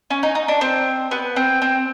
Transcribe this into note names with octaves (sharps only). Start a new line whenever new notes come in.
C#4
D#4
D#4
D4
C4
B3
C4
C4